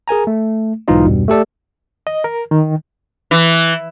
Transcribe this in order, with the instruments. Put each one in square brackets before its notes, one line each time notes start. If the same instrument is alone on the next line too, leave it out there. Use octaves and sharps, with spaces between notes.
[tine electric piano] G#4 A#4 G#5 A#5
A3
B1 G#2 E3 D#4 F4 D#5
E2 G2 B2 G3
A3 G4 A4 D5
[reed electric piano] D#5
A#4
D#3
[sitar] E3